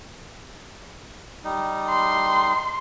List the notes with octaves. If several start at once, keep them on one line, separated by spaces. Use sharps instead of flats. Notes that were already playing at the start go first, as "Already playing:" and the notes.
G3 D#4
C6